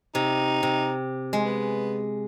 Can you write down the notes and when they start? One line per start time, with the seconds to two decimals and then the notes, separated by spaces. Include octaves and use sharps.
0.15 C3 D#4
0.63 C3
1.33 G#3
1.45 B3